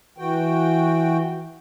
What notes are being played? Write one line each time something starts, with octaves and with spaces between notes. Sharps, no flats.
E3 F#4 G5